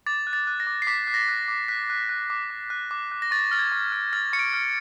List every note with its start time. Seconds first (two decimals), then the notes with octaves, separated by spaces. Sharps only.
0.06 D6 A6
0.27 F#6
0.33 A6
0.47 F#6
0.60 A#6
0.67 D6
0.82 C7
0.87 D6 B6
1.07 F#6
1.14 A#6
1.28 F#6
1.48 D6
1.68 F#6 B6
1.90 F#6
2.09 F#6
2.30 D6
2.50 D6
2.70 F#6
2.91 D6
3.12 F#6
3.22 A#6
3.31 C#6 A6
3.51 F6 A6
3.59 G#6
3.72 C#6
3.92 F6
4.13 F6 A6
4.33 C#6 C#7
4.39 D7
4.53 F6